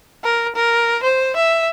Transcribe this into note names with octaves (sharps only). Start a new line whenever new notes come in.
A#4
A#4
C5
E5